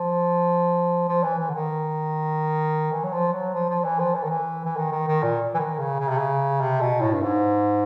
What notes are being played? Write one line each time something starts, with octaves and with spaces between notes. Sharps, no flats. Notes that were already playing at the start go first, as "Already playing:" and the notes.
Already playing: F3
F3
E3
E3
D3
D#3
E3
F#3
F3
F#3
F3
F3
E3
F3
E3
D#3
E3
E3
D#3
D#3
D#3
A#2
E3
D#3
C#3
C#3
C3
C#3
C3
B2
A2
G2
G#2